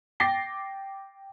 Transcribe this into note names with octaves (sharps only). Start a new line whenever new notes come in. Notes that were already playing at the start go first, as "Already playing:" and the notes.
G5 D6 A6 A#6 C7 G7